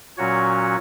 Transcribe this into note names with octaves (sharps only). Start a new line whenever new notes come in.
A#2 F#3 C#4 F#4 C#5